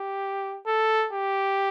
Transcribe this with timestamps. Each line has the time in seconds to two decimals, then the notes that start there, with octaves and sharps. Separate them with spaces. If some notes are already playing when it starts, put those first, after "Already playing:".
Already playing: G4
0.67 A4
1.13 G4